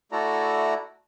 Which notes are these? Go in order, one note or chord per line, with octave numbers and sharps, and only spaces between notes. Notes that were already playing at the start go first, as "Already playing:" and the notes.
A3 E4 F#4 A4 D5 A#5